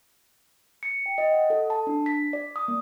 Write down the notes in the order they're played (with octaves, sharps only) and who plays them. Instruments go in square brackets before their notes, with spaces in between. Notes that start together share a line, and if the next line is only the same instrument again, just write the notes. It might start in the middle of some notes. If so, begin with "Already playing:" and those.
[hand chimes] C#7
G5
D#5
F#5
A4
A5
D4
B6
D5
D#6
A#3